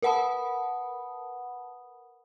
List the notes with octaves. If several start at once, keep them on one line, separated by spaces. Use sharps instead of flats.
A#4 B4 F#5 A5 B5 D#6